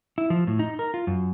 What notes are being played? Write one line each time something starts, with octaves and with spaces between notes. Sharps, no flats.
E4
F3
A2
D#4
A#4
F4
F#2